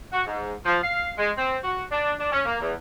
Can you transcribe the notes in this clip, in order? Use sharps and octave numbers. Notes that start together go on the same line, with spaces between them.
F#4
G#2
F3
F5
G#3
C4
F#4
D4
D4
C#4
A#3
E2